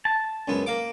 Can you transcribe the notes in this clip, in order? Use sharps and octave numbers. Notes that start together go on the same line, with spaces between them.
A5
C#2 F#2 B3
A#3 F5 D6